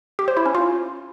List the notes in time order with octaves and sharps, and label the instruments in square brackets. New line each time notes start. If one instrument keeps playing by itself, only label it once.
[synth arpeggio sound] G4
C5
E4
C#4
F4